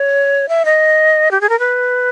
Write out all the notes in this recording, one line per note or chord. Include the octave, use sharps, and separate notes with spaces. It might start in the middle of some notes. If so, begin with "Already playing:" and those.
Already playing: C#5
E5
D#5
G4
G#4
A#4
B4